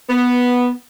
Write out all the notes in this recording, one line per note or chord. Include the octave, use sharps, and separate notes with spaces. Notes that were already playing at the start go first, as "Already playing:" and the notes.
B3